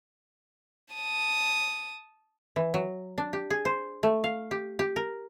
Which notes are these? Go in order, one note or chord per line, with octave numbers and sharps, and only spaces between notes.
A5 D#6
E3
F#3
D4
G4
G#4
C5
A3
F5
G4
G4
A#4